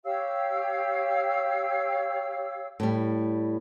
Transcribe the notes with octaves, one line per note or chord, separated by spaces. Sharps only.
G4 C#5 F5 E6
A2 G3